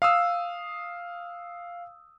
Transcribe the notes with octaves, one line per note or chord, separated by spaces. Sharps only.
F5 D#6 E6